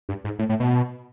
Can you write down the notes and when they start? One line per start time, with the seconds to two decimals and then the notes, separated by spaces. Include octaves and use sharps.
0.09 G2
0.24 G#2
0.39 A2
0.49 A2
0.60 B2